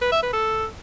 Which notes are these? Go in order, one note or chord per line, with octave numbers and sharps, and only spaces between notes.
B4
E5
B4
A4